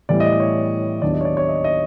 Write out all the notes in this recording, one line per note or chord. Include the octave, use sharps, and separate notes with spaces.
A2 E3 G3 B3 D5
D#5
D5
C#5
D#2 D#3 F#3 B3 D4 D5
D#5
C#5
D5
C#5
D#5
D#5